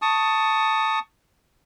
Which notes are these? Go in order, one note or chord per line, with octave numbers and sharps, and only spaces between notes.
A5 C#6 D#6